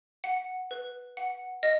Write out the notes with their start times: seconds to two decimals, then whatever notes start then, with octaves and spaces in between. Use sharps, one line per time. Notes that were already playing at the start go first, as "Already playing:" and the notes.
0.24 F#5
0.71 B4
1.17 F#5
1.63 D#5